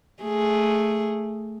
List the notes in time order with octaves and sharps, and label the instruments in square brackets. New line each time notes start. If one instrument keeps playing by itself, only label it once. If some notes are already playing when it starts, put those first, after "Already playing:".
[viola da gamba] A3 G#4